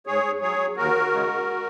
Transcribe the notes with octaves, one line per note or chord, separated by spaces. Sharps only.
G#2 G#4 C#5
F#3 G#4 C#5
D#2 F#4 A#4
C#3 G#3